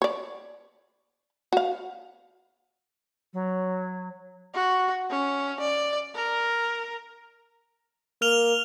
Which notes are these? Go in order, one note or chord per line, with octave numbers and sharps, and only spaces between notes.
C#5 D5
F#4 F5
F#3
F#4
C#4
D5
A#4
A#3 F6 F7 G7